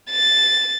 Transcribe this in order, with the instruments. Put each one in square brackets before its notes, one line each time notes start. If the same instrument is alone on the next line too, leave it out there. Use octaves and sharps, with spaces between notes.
[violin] A6